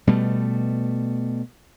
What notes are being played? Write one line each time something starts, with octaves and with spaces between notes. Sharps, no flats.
B2 G3 A3